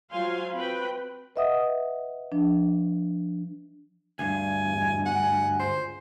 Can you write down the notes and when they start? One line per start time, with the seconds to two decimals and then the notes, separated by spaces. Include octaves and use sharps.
0.11 F#3 F4 C5 F5 G#5 C6
0.55 C4 F#4 B4 G5 B5
1.36 B4 D#5 E5 F#5 D#6
2.32 F3 D4
4.19 D2 G2 G#5
4.65 E2 B2 D#3
5.06 F#5 G#5
5.59 C#2 C5